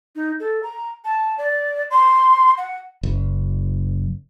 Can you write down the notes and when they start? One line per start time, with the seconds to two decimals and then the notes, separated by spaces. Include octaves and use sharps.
0.16 D#4
0.40 A4
0.63 A#5
1.05 A5
1.38 D5
1.91 C6
2.58 F#5
3.03 F#1